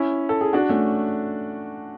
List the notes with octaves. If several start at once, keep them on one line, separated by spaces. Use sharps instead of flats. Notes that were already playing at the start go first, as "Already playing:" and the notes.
Already playing: C#4 E4
A4
G#4
D4 F#4
A3 C#4